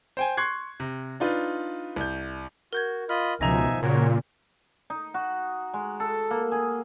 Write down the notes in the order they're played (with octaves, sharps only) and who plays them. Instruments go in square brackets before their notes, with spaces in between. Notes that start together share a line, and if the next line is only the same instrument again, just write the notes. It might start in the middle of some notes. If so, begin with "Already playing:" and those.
[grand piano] C5 G5 G#5
C6 C#6 F#6 G#6 C7
C3
D4 D#4 F4 B4
C2 G6
[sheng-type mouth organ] F#4 [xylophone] A#4 G6 G#6
[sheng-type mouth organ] F4 D#5 B5 [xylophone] F6
[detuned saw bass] C#2 [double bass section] B2 F3 [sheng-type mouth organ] D#4 E5 G#5 [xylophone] A#5 A#6
[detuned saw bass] A#2 [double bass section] C#3 [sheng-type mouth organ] F#4 A#4 C#5
[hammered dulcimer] D#4
F#4
G#3
A4
A#3
G#4